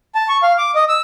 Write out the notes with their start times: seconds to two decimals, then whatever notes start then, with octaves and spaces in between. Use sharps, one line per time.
0.15 A5
0.28 C#6
0.43 F5
0.58 D6
0.75 D#5
0.89 E6